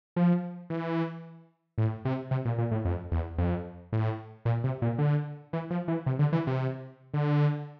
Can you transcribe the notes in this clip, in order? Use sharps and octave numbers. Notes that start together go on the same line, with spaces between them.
F3
E3
A2
C3
C3
A#2
A#2
A2
F2
E2
F2
A2
A#2
C3
A#2
D3
E3
F3
E3
C3
D3
E3
C3
D3